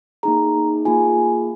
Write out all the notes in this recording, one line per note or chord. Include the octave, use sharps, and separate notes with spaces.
A#3 D#4 G#4 A#5
A#3 F4 G#4 G#5